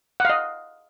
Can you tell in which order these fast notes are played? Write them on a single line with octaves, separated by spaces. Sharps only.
F#5 F5 D#5